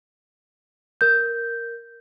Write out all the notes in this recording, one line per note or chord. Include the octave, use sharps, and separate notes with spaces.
A#4 G6